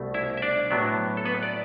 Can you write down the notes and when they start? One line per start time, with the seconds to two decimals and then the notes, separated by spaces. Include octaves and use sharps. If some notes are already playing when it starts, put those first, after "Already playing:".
Already playing: C2 B2 A3
0.14 E4 E5
0.37 E5
0.42 D4 D5
0.70 A2 F#3 B3 D4
1.17 A4
1.25 B3 B4
1.43 D5